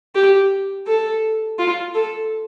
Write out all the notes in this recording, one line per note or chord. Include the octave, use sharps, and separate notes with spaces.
G4
A4
F4
A4